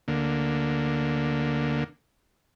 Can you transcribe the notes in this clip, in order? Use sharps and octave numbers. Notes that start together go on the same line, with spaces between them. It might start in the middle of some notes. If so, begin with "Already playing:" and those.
D2 D3 A#3